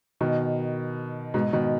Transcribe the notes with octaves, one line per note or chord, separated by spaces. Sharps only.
B2 D#3
G#2 B2
B2 D#3